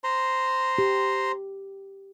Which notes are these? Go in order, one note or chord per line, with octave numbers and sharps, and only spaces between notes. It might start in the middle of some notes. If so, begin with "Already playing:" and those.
C5 A#5 C6
G4